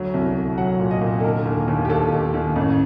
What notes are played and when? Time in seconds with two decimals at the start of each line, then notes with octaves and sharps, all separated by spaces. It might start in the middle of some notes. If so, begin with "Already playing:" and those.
Already playing: D2 F#3
0.14 C2
0.35 C2
0.58 F#3 F#5
0.80 A#2
0.91 D#5
1.01 A#2
1.20 A4
1.24 D3 A#4
1.46 D#2
1.68 D#2
1.85 G4
1.90 D#2 A4
2.12 D#2
2.34 D#2
2.56 A1